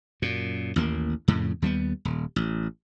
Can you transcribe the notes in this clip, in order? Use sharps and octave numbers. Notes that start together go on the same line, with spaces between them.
F#2 A#2
A1 D#2 A#3
F2 A2 C#3
D#2 G3 A3 B3
D#1
A1